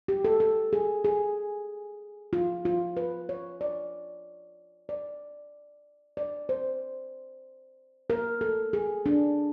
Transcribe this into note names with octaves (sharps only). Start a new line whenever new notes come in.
G4
A4
A4
G#4
G#4
F4
F4
B4
C#5
D5
D5
D5
C5
A#4
A4
G#4
D4